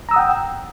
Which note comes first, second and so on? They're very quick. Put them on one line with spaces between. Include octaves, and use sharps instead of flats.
A#5 E6 D#6 F#5 G5